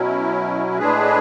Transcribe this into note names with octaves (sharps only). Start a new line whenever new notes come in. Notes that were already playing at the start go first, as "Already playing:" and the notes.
Already playing: B2 F#3 C#4 E4
A2 G#3 D4 G#4 B4